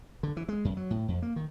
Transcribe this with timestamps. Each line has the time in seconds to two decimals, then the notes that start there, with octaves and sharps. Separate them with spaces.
0.23 D3
0.37 E3
0.49 G#3
0.65 F#2
0.77 F#3
0.91 A2
1.08 F2
1.22 A#3
1.36 D#3